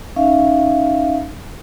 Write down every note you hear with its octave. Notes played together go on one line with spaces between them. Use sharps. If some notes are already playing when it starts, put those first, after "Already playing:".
C#4 D#4 E5 F5